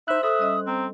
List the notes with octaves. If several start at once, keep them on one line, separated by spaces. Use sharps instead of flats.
D#4 C5 E5 F#6
A4 E5 D#6
G3 C#4 D#5
C4 A#5